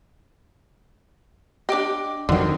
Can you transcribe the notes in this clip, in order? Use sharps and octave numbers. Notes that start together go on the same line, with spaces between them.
D4 G4 D#5 G5 D6
F2 D3 D#3 F#3 C4